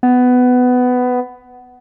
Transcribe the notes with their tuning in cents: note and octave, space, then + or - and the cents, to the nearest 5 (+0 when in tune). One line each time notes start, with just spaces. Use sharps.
B3 +15